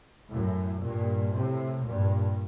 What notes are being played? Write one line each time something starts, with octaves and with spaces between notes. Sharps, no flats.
F#2 A2
G2 A#2
A2 C3
G2 A#2